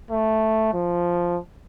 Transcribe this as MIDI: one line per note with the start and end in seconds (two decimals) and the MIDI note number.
0.11 0.69 57
0.73 1.39 53